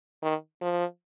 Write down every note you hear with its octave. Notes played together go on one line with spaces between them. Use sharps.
D#3
F3